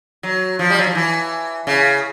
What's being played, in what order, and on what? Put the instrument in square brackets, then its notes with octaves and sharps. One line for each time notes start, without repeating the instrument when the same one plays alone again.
[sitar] F#3
F3
G3
F#3
F3
E3
C#3